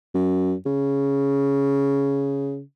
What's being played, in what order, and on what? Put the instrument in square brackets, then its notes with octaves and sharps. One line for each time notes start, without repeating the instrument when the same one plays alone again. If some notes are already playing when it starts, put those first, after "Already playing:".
[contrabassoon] F#2
C#3